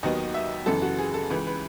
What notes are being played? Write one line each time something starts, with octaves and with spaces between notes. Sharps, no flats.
D#2 D#3 F#3 B3 D#5
E5
F#2 C#3 E3 B3 A4
F#4
G#4
A4
C#2 C#3 E3 B4
B4